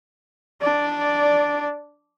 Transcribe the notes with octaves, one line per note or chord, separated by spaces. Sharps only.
D4 D5